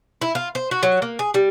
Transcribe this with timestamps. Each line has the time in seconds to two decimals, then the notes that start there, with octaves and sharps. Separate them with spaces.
0.21 E4
0.35 F4
0.55 C5
0.71 F#4
0.83 F#3
1.02 A#3
1.19 G#4
1.34 G3